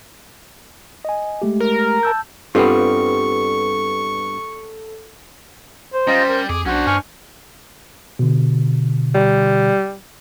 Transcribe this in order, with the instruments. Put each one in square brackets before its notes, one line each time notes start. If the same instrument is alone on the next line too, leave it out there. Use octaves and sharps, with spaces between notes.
[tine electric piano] D#5 G#5
G#3 A3 G4
[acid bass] A#4
[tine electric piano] A5 E6 G6
[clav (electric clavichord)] G2 B3 [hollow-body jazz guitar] G3 C4 F4 [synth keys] A4 [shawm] C#6
[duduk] C5
[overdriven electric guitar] G3 [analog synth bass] C#4 [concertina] F4 D#5 A#5
[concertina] A#4
[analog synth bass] F2 [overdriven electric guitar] G#4 [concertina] D6
[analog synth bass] B1 [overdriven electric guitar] C#4 C5 [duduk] D4 [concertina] F#4
[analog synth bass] G2 [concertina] G#5 C#6 F6
[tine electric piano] B2 D3
[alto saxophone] G3